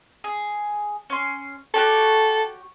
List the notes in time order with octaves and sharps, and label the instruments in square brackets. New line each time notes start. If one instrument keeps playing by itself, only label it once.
[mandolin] G#4
C#4 C6
[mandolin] F#4 G4 C#5 [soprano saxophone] A4